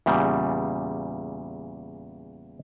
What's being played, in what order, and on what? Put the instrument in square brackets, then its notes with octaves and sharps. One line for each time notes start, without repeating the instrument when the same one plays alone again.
[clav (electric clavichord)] E2 A#2 C#3 G3